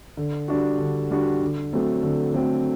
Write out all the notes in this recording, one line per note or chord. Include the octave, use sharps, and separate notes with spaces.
D3
G3 D4 F#4
D3
G3 D4 F#4
D3
F#3 A3 C4
D3
F#3 A3 C4